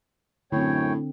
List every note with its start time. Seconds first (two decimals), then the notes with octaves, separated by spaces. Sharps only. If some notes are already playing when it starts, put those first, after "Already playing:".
0.52 F#2 A2 D3 C4 C#5 G5